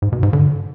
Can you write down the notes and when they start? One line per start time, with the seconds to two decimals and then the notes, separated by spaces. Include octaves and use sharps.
0.02 G#2
0.12 B2
0.23 G#2
0.33 D3